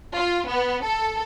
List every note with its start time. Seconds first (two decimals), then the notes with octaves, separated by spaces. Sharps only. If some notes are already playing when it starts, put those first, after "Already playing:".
0.15 F4
0.48 B3
0.83 A4